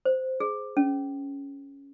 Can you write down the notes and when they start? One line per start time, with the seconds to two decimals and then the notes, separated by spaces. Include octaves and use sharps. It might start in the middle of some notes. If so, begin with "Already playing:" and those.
0.05 C5
0.40 G#4
0.77 C#4